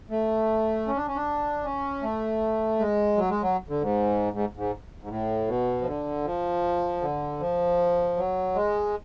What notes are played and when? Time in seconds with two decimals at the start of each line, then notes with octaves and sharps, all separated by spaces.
0.10 A3
0.87 C#4
0.97 D4
1.07 C#4
1.16 D4
1.64 C#4
2.02 A3
2.79 G#3
3.17 F#3
3.30 G#3
3.42 F#3
3.69 D3
3.82 G#2
4.33 G#2
4.57 G#2
5.03 G#2
5.09 A2
5.48 B2
5.82 F3
5.86 D3
6.25 F3
7.01 D3
7.40 F3
8.17 F#3
8.55 G#3